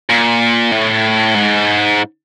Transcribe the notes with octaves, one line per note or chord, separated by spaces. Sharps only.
A#2
A2
G#2